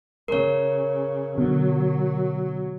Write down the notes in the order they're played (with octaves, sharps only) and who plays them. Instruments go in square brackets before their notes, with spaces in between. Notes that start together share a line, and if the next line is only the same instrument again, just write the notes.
[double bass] C#3 [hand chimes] A#4 C#5
[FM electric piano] B2 D3 [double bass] F#3